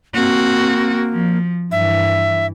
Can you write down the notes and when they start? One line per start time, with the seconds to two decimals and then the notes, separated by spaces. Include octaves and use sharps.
0.14 A#3 C4 F#4
1.11 F3
1.72 G2 E3 E5